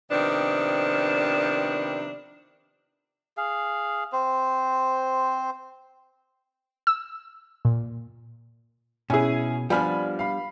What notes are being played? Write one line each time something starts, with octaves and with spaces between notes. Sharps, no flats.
C3 D#3 F3 B3 D4
G#4 F5
C4 C5
E6
A#2
B2 C#4 E4 G#4 G#5
F3 G3 B3 D4 G#5 B5 F6
F5 B5